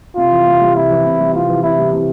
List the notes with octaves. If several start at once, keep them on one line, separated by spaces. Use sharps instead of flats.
C3 F4
E3
C3
G3
C3 E4
E3
C3
G3
C3 F4
E3
C3 E4
G3
C3